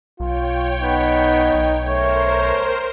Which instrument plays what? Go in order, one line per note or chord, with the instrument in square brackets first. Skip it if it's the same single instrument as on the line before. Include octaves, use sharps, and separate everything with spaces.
[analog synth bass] B1 [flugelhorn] F4 [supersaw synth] C#5 G5
[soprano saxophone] B3 [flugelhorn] D#4
[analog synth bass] B1
[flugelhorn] A3 [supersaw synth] A#4 C5 [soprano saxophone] C#5